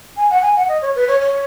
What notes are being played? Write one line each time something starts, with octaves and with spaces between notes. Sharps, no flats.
G#5
F#5
G#5
F#5
D#5
C#5
B4
C#5
C#5